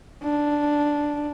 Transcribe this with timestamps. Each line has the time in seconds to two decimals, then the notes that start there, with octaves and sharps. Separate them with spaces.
0.23 D4